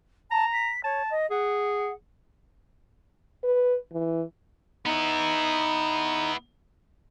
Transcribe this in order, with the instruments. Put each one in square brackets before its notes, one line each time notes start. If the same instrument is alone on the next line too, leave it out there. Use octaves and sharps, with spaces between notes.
[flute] A5 [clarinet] A#5
[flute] B6
[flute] C#5 [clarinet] A5
[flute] D#5
[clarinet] G#4 [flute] F#5
[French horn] B4
E3
[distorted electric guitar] B3 E4 [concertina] D#4